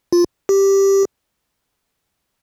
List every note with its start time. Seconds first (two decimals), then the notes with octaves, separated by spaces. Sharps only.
0.13 F4
0.49 G4